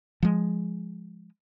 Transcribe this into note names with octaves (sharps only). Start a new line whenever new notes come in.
F3 G#3